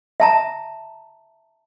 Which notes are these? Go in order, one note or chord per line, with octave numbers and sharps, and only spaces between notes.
E5 A5 A#5